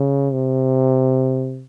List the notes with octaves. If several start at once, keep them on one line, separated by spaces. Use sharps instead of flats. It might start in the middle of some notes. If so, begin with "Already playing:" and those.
Already playing: C#3
C3